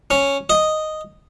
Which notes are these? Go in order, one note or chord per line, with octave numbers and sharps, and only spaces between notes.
C#4
D#5